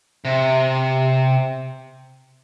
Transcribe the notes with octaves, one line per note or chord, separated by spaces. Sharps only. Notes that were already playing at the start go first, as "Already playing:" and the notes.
C3